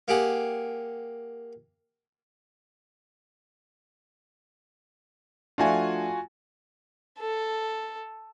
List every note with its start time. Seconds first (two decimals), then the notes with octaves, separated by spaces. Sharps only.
0.08 A#3 G4 G#4 F#5
5.58 F3 A3 D4 F4 F#4 G#5
7.19 A4